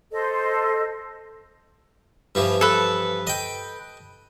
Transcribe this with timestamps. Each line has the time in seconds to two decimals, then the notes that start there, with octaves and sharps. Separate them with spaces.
0.12 A4 C5 D#5
2.35 G2 E3 F3
2.61 A4 B4
3.27 D#5 G5